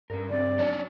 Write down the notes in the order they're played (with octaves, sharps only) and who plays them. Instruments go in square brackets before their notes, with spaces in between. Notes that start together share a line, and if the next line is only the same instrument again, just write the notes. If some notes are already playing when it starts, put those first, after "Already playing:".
[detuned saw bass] G2 [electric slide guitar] C#4 A#4
[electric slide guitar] C#3 C4 [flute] D5
[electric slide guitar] F#3 [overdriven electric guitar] C#4 D4